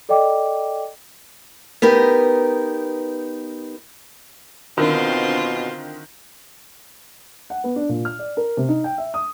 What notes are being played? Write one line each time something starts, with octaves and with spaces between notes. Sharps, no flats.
A4 D5 D#5 G5 D6
B3 D#4 G4 A#4
B2 D3 D#3 C4 F4 F#4 A#4 C5
F#5
B3
D4
A#2
F6
D5
A#4
C3
D#4
G5
E5
D#6